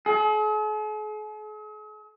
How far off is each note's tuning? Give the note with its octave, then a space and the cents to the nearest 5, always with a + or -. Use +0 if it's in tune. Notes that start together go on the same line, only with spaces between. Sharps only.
G#4 +45